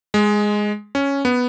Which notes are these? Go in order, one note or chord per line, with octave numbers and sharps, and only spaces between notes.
G#3
C#4
B3